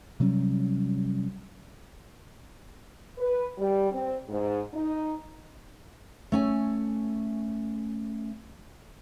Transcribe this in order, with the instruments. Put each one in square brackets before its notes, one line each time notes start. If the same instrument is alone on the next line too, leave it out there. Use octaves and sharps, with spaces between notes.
[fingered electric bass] C3 F#3 G3 C#4
[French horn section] B4
G3
C4
G#2
D#4
[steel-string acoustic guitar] A3 C#4 G#5